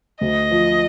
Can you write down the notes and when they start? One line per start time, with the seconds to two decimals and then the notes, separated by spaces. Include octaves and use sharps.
0.21 D2 D#5
0.51 F3